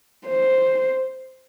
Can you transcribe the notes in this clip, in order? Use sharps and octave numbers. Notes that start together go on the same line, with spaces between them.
C5